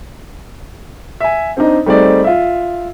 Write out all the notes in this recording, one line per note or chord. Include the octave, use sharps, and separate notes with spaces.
E5 G#5
C4 D4 D#4
G3 A3 C4 D#4 G#4 D5
F4 E5